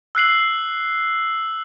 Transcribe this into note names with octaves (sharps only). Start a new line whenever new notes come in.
E6 F#6 C7 F#7